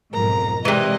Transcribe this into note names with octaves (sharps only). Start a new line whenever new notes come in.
B1 F2 G#2 A#4 A#5
C3 E3 G#3 D5 D#5